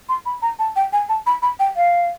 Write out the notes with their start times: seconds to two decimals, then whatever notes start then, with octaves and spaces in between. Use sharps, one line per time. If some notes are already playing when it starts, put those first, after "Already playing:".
0.09 C6
0.26 B5
0.42 A#5
0.59 A5
0.76 G5
0.93 G#5
1.09 A5
1.26 B5
1.42 B5
1.60 G5
1.77 F5